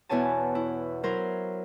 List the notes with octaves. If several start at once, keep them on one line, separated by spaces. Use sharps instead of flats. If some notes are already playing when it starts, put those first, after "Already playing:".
E2 B2 E4 C#5 G#5 A5
E4
F#3 E4 A#4 C5